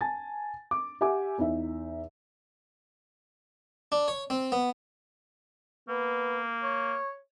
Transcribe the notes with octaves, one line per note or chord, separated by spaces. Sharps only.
G#5 A5 A6
D6
G4 E5 F#5 G#5 D6
E2 D#4 E5
D4
C#5
C4
B3
A#3 B3
C#5